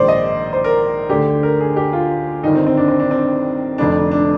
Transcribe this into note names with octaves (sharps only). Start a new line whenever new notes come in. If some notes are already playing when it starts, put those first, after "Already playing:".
Already playing: A#1 G#2 D#3 C5 D5
D#5
C5
A#4
D2 D3 G4
A#4
G#4
G4
F4
G1 G2 D#3 D#4
C4
C4
D4
C4
D4
C4
F1 F2 D3 D4
D4